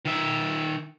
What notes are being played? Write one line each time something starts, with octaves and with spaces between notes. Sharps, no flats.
D#3 E5